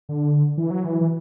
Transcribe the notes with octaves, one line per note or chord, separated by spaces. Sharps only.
D3
E3
F#3
E3
E3